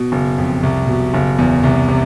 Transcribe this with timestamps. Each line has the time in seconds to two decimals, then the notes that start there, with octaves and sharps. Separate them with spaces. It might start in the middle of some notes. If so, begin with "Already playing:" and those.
Already playing: B2
0.12 F#1
0.38 F2
0.63 C2
0.87 B2
1.14 F#1
1.39 E2
1.64 C2
1.89 C3